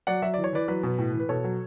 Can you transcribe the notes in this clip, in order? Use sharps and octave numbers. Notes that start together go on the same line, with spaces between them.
F#3 D5 F#5
F#3 E5
E3 D5
C#5
E3 B4 D5
F#3 B4
B2
A2
E3
B4
B2 A4 C#5
F#3